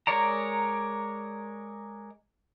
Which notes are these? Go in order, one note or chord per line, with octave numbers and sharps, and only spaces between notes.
G#3 A#4 C#5 D5 A#5